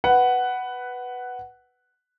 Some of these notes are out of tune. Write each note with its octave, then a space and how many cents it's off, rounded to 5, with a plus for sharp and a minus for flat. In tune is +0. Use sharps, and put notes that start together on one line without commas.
B4 +0 F#5 +10